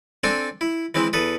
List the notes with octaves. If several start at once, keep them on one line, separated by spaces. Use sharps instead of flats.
C4 D4 A4 G#5
E4
E3 G#3 C4 E4
E2 A4 B4 D#6